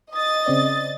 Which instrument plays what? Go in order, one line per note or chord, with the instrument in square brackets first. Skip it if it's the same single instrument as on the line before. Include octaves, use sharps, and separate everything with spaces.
[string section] D#5 A6 [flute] D#6
[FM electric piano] C#3 C4 D5